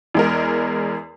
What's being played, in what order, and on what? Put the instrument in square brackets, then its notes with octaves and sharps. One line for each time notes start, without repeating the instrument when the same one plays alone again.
[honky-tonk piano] E2 G#3 A#4